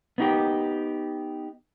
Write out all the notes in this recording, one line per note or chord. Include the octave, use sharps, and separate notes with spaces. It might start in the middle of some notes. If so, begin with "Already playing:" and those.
B3 D#4 G4